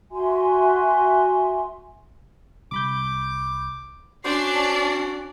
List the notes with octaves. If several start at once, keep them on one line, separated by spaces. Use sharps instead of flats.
F#4 E5 G#5 C6
C2 B5 D6 G6
C#4 D4 F#4 C5 D5 C7